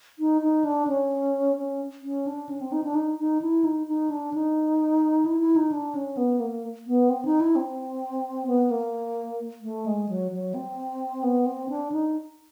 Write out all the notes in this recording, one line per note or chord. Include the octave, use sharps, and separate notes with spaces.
D#4
D#4
D4
C#4
C#4
C#4
D4
C#4
C4
D#4
D4
D#4
D#4
E4
D#4
D#4
D4
D#4
E4
E4
D#4
D4
C#4
B3
A#3
B3
C4
D#4
E4
C4
B3
A#3
A3
G#3
F#3
F#3
C4
B3
C4
D4
D#4